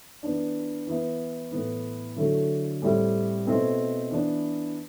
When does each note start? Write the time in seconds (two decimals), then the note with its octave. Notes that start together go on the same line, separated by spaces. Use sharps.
0.23 E3 B3 D4
0.87 E3 B3 E4
1.51 A2 E3 B3
2.16 D3 F#3 A3 E4
2.82 A2 G3 C4 E4
3.46 B2 A3 C4 E4
4.11 E3 B3 D4